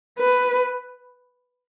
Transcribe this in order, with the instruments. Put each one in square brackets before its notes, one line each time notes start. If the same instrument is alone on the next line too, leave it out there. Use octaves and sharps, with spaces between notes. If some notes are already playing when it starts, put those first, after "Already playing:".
[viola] B4